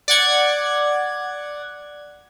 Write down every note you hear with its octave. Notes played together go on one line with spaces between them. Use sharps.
D5 F#5 G#6